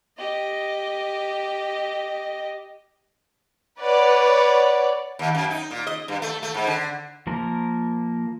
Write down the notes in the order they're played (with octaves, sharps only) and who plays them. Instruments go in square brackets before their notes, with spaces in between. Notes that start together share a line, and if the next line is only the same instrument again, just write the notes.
[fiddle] G4 D#5
[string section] B4 C#5 D5 F#5
[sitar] D#2
F#2
D#4
A#2
D#5
G2
A3
A3
G#2
D3
[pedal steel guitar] F3 A#3 A#4